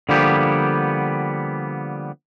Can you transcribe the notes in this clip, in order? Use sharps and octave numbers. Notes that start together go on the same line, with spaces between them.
D3 F3 G3 A#3 B3 G4